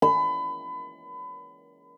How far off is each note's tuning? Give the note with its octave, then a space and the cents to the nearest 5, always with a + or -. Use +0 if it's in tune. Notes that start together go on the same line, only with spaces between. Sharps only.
B5 +30